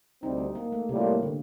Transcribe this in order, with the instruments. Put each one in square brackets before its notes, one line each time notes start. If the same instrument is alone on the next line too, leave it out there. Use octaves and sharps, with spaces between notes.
[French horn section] D2 C3 G3 C4 [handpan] D#4
[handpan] A#3
A3
[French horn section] A2 G3 A#3 F4 [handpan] C3
[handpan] D3